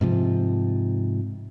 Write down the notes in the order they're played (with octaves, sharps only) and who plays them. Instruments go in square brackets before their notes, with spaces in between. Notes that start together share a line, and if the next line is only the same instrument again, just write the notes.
[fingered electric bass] G#2 C3 F3